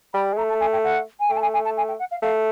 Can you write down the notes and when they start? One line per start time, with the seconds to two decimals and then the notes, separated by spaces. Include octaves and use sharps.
0.13 G3 B5
0.33 G#3
0.37 A3 A#5
0.49 A5
0.60 G#5
0.72 G5
0.84 F#5
1.20 G#5
1.30 A3 G5
1.37 A5
1.42 G#5
1.53 G#5
1.64 A5
1.77 G#5
1.88 G5
1.99 F#5
2.11 F5
2.22 A3 F5